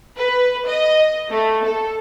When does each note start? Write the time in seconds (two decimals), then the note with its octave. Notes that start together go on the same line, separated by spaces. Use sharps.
0.18 B4
0.67 D#5
1.30 A3
1.65 A4